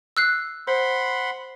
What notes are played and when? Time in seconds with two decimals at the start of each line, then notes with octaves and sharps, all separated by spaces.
0.17 E6 F#6 C7
0.67 C5 F#5 B5 C6